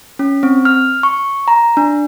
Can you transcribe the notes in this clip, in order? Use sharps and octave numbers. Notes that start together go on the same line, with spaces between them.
C#4
C4
F6
C#6
A#5
D4